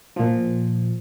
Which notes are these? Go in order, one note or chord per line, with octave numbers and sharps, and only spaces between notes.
A#2 F3